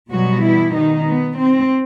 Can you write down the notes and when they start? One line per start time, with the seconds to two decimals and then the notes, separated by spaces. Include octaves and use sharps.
0.11 B2 F#3 G3 B3 F#4
0.43 E3 E4
0.74 D#3 D#4
1.05 B3
1.36 C4